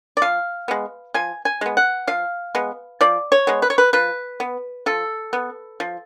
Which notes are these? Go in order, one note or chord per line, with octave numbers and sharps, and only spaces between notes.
D5
F3 F5
G#3 B3
F3 G#5
G#5
G#3 B3
F#5
F3 F5
G#3 B3
F3 D5
C#5
G#3 B3
B4
C#5
B4
F3 B4
B3
F3 A4
B3
F3